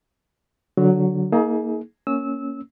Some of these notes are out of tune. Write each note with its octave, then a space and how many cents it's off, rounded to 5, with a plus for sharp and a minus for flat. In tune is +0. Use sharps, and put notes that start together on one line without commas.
D3 -15 F#3 +0
A#3 +0 D#4 +35 G#4 +30
A#3 +0 C#4 +0 E6 -20